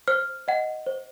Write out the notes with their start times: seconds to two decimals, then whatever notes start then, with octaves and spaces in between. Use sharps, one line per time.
0.08 C5 F6
0.48 D#5 F#5
0.86 C5